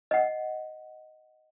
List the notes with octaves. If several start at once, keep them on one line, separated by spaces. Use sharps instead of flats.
D#5 F#5